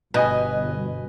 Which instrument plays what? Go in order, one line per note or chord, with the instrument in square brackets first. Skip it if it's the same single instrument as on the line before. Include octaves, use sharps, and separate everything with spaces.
[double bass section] G1 [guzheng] B2 [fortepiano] B4 D#5 G#5